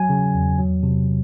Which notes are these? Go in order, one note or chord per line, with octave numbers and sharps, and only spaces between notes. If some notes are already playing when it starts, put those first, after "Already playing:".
Already playing: F#3 G#5
C#3
E2
F#3
C3